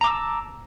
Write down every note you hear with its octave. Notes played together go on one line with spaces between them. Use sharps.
A5 A#5 D6 E6